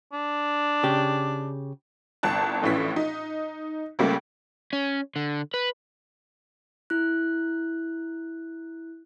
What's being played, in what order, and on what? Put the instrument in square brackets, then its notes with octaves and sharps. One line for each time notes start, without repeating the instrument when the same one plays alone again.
[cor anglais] D4
[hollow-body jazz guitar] C#3 G4
[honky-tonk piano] G1 C2 A5 F#6
A#1 A2 E3 C#4 B6
D#4
C#2 C#3 G3 A3 A#3
[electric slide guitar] C#4
D3
B4
[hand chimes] E4 F#6